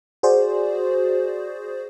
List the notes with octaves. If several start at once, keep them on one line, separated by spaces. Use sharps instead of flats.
F#4 G#4 C5 D5